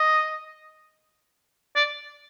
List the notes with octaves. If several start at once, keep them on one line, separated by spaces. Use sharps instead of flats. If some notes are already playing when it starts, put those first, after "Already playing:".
Already playing: D#5
D5